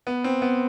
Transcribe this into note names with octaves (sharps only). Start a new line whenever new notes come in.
B3
C4
B3